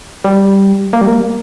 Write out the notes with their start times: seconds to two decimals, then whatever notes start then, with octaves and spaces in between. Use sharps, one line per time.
0.24 G3
0.93 A#3
1.01 G3
1.08 A#3